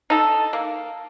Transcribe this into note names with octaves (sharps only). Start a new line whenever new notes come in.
D#4 A4
A#3